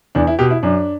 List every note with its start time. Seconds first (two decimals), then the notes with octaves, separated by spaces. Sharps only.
0.15 E2 D4
0.27 E4
0.39 B2 G4
0.51 E4
0.63 F#2 D4